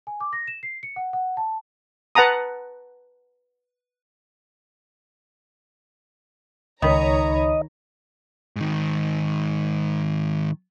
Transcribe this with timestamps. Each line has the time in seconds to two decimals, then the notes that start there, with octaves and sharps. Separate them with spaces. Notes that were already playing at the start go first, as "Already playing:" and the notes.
0.07 G#5
0.20 D6
0.33 A#6
0.48 E7
0.63 C7
0.83 C#7
0.96 F#5
1.13 F#5
1.37 A5
2.15 B4 F#5 A5 A#5 D#6
6.82 C#2 D#3 D#4 C#5 D#5 A#5 B5
8.56 G#2 D#3